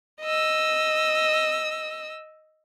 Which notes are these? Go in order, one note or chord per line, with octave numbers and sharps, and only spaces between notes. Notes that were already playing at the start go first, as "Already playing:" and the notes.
D#5 E6